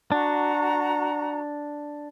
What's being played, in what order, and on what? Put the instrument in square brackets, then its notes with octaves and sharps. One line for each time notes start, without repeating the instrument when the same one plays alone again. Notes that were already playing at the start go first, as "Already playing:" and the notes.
[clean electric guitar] D4 [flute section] F#4 A#5